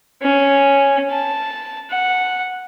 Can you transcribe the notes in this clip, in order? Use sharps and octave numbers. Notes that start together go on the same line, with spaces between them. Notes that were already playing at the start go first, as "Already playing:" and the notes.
C#4
A5
F#5